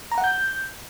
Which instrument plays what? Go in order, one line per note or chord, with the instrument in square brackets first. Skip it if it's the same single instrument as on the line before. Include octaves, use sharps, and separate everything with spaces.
[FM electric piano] A#5
F#5
G6